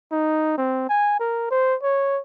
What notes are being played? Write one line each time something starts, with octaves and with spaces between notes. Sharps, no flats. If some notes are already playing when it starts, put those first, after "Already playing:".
D#4
C4
G#5
A#4
C5
C#5